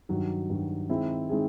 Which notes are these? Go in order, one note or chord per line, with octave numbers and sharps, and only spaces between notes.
G2 D#3 F#3
G2 D#3 F#3
D#3 G#3 C4 E4 G#4
D#3 G#3 C4 E4 G#4